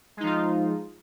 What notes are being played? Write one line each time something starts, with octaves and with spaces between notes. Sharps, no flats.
F3 G#3 D#4 F4